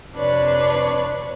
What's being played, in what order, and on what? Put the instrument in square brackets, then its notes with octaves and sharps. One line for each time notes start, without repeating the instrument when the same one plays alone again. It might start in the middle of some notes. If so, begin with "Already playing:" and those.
[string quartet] F2 C3 D4 B4 C#5